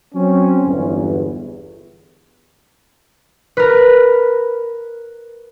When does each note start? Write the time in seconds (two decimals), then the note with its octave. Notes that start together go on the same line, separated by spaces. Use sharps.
0.14 F#3 C4 C#4
0.64 G1 E2
3.57 A#4 B4